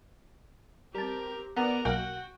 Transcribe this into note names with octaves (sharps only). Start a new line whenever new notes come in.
G3 C4 G4 A#4 A5
B3 A#4 D5 F#5
B1 A#3 F#4 F#5 G5 A#6